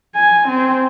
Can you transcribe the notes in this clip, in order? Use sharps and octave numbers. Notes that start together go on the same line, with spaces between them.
G#5
C4